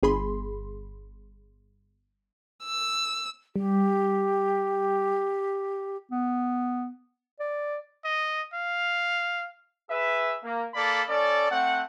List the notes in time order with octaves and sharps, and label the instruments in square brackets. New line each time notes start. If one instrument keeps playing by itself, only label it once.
[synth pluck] G1 G#4 B5 C6
[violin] E6
[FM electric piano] G3 [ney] G4
[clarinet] B3
D5
[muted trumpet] D#5
F5
[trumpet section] G#4 B4 E5
A#3
A#3 A4 D5 B5
C#4 A4 D5
A3 C4 F#5